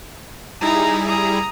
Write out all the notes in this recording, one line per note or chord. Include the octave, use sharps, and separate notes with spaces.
G3 D#4 E4 G#4 A#5
A#5 D#6